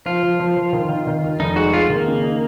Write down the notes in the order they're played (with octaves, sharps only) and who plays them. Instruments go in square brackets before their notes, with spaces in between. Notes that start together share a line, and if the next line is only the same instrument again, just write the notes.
[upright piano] F3 [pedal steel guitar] F4
[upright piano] F3
F3
F3
D#3
D#3
D#3
D#2
[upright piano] F1 [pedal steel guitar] D#4
[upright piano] G#3 [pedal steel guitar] F#4
[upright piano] G#3 [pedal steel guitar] F4
[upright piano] D#3 [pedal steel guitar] A#3
[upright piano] C#3
D#4